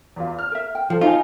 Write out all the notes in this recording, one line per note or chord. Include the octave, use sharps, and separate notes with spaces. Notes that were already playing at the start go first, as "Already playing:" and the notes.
E2 F4
F6
A#4 E5
G5
F3 A4 C5
D#4 F4 G#5